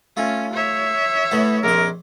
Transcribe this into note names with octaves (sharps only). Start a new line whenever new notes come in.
A3 C#4 F4
C#5 E5
A2 B3 A5
A#1 F2 A#4 C5